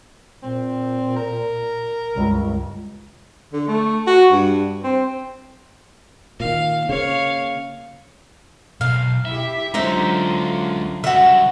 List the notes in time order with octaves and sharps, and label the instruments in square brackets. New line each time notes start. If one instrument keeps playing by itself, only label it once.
[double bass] A#2 [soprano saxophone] C4
[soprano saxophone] A#4
[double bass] C#2 G2
[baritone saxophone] D3
A3
F#4
G2
C4
[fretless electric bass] A#2 D#3 [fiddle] F5
[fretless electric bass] C#3 A#3 [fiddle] C#5 F5
[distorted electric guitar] B1 [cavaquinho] F5
[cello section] E4 G4 [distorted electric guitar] E5
[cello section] D3 F#3 F4 [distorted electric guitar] G#3 C#4 [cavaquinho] D#4 C5 E5
[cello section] F#2 [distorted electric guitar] C#3 G3 [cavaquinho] F#4 E5